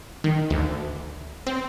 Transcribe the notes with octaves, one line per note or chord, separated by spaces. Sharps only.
D#3
D2
C4